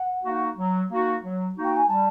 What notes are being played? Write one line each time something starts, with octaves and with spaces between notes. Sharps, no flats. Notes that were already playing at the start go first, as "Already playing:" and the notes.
Already playing: F#5
A#3 D#4 F#4
F#3
A#3 D#4 F#4
F#3
A#3 D#4 F#4
G5
G#5
G3 A5